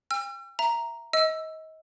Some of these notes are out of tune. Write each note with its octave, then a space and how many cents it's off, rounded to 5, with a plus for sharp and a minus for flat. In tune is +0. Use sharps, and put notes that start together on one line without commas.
G5 +40 E6 +45
E5 +15 A#5 +0
D#5 +30 E6 +5